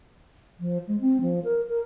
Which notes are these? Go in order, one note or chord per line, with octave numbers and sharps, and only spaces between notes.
F3
G#3
C4
F3
A#4
A#4